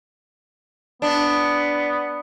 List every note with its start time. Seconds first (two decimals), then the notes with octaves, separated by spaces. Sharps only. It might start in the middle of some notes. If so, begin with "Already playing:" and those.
1.02 B3 D4